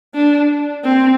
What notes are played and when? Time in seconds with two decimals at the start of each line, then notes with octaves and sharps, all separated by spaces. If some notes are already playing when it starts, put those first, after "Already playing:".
0.15 D4
0.84 C4